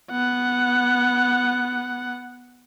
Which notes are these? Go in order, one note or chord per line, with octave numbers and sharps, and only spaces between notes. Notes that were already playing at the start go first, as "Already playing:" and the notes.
B3 F#5